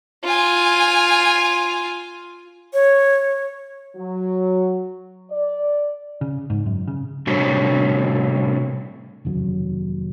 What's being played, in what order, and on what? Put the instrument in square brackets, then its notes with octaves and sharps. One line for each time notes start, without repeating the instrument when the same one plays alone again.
[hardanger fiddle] F4 G#5
[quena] C#5
[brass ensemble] F#3
D5
[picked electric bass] C#3
G#2
F#2
C#3
[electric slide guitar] A2 C3 G3 C#4 D4 F#4
[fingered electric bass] F1 D#2 C#3 F#3